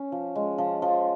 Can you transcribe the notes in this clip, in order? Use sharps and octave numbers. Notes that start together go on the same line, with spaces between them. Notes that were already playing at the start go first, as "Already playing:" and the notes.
Already playing: C#4
F3
G#3
F3
F3